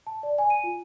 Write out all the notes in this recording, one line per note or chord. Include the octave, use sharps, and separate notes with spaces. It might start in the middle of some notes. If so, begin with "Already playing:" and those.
A5
D5
G#5
D#7
F4